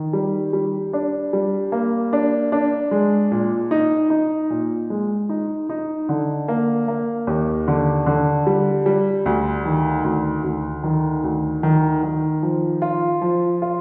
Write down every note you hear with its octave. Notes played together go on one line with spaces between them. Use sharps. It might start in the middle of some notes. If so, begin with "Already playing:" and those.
Already playing: D#3
G3
G3
D4
G3
A#3
D4
D4
G#3
A#2
D#4
D#4
A#2
G#3
D#4
D#4
D3
A#3
A#3
D#2
D3
D3
G3
G3
D2
D#3
D2
D2
D#3
D2
D#3
D#3
F3
F4
F3
F4